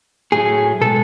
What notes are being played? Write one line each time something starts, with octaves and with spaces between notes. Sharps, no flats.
A2 F#3 A3 G#4
B2 G#3 A4